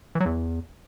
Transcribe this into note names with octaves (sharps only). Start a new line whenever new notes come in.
E3
F#3
E2